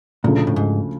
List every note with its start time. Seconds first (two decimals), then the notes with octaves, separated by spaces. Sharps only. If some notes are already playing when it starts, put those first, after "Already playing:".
0.24 D2 A#2 C#3 F3
0.47 A2
0.56 G#2